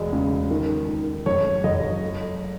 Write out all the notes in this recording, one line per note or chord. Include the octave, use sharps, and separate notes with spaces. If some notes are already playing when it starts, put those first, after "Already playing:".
Already playing: E1 G#3
C#3
D#3
D#3
F#1 C#5
F#1 D#5
A3